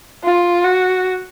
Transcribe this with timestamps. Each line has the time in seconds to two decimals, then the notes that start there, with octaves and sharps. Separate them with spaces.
0.24 F4
0.65 F#4